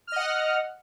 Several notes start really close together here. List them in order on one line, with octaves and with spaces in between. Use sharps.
F6 D#5 F#5